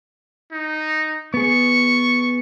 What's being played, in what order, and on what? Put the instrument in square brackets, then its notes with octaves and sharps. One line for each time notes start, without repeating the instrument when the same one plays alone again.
[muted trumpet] D#4
[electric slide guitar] B3 G#4 [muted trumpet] C#6